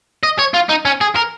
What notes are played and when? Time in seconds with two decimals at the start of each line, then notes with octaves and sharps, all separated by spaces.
0.24 D#5
0.39 C#5
0.54 F4
0.69 D#4
0.85 C#4
1.01 G#4
1.16 A#4